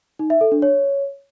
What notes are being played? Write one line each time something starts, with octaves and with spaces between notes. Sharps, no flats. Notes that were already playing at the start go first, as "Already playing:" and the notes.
D#4
E5
A4
D4
C#5